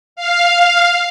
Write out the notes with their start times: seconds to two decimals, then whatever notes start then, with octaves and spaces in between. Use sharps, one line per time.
0.16 F5